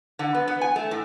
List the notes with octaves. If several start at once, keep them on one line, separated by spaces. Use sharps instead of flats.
D3
B3
B3
G#5
A3
A2